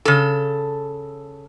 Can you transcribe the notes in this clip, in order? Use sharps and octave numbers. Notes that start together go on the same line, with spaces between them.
C#3 A4